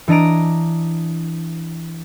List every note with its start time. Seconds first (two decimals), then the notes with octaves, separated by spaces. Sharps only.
0.08 E3 D4 D#5 A#5 D7